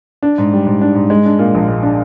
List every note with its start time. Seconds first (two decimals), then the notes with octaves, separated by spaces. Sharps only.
0.23 D4
0.38 G#2
0.53 G3
0.67 G#2
0.82 D4
0.95 G#2
1.10 G#3
1.26 D4
1.39 A#2
1.55 A#1
1.68 G#3
1.83 D4